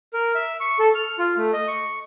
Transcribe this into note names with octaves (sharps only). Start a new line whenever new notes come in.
A#4
E5
C#6
A4
F6
F4
A3
D#5
C#6